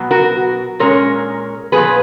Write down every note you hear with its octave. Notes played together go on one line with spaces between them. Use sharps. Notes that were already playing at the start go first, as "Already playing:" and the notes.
Already playing: B2 F#3 B3
F#4 A#4
A#2 G#3 C#4 A#4 C#5
A#2 F3 G#3 B3 G#4 B4